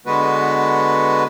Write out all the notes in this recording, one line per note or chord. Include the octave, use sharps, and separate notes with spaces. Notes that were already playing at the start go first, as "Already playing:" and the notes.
D3 G#3 B3 F#4 B4